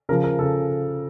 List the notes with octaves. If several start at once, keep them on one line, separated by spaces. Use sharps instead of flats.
C#3 F3 A#4
A#4
C#3 A4